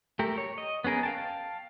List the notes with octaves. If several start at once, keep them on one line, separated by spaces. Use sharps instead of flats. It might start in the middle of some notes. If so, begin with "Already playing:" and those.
A3 G4 A#4
C#5
D#5
B3 C#4 G#4 A#4
F5 G5 A5